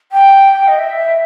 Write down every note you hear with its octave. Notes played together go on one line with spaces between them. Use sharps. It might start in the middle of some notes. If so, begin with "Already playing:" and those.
G5
D#5
E5